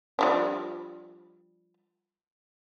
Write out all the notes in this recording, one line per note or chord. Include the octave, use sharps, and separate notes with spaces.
F3 G3 D4